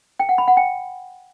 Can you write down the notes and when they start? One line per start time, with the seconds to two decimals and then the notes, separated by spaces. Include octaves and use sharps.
0.20 G5
0.29 F#5
0.38 B5
0.48 F#5
0.57 G5